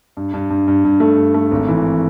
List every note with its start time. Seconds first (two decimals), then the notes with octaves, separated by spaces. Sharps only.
0.17 G2
0.34 G2
0.50 G2
0.68 G2
0.85 G2
1.00 A3
1.17 G2
1.34 A3
1.51 G#1
1.68 E3